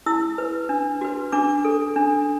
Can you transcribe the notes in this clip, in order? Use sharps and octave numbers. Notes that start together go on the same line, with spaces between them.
E4 E6
B4
D4
F#4 B4
D4 D6
A4
D4